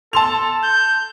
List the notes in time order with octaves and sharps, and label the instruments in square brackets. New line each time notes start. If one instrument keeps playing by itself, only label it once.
[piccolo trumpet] A4 [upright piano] A5 C6 F7
[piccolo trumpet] G6